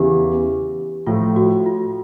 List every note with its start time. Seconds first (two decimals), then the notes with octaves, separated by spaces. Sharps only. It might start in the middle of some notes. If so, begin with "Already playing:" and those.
Already playing: E2 C#3 E3 G4
1.07 A2 F3 A3 F4
1.36 F#4
1.66 F4